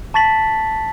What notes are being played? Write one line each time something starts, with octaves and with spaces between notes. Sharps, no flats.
A5 C#6 A6 B6 F#7